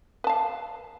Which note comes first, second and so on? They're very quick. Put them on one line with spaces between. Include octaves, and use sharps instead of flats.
B4 A5 F5